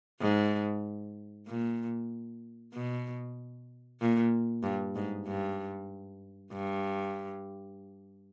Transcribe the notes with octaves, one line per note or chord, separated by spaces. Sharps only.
G#2
A#2
B2
A#2
G2
G#2
G2
G2